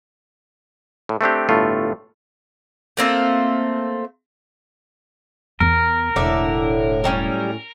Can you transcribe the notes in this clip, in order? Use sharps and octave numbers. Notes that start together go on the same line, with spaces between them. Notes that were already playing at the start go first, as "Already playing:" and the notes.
A2
A3 C4 D4 G4
G1 A2 A3 F4
A3 A#3 C4 F4
E2 B3 A#4
E1 A2 D3 D5 E5
F#3 G3 C#4